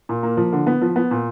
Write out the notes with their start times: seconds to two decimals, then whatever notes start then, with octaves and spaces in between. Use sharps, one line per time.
0.09 A#2
0.23 A#3
0.37 F3
0.53 D3
0.67 B3
0.82 F3
0.96 B3
1.11 A#2